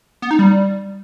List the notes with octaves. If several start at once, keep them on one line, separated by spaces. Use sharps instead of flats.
B3
D#4
G3